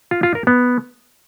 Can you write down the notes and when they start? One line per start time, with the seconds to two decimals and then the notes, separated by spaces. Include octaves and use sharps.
0.11 F4
0.23 F4
0.35 A#4
0.47 B3